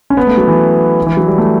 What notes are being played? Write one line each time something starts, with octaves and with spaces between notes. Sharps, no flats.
C#4
B3
A3
F#3
E3
E3
F#3
G3
A3